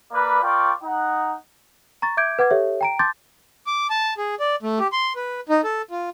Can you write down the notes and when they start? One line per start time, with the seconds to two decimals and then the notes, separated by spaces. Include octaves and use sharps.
0.12 A#3 B4 D5
0.43 F4 A#4 D5 F5 G5 C#6
0.83 D#4 F#5
2.02 A#5 C#6 A6
2.17 E5 D6 G6 G#6 D7
2.39 B4 F#5 D6 G#6
2.51 G4 A4 C#5 E5
2.81 G5 A#5 D7
2.99 A5 C6 D6 G6 A6
3.67 D6
3.90 A5
4.18 G#4
4.40 D5
4.63 A3
4.79 G4
4.92 C6
5.16 B4
5.49 D#4
5.64 A4
5.91 F4